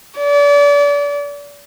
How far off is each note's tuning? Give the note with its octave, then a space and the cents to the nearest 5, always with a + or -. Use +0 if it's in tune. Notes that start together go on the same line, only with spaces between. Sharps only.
D5 -35